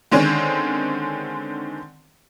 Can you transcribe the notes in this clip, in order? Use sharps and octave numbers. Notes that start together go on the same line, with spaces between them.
D3 D#3 G#3 C4 C#4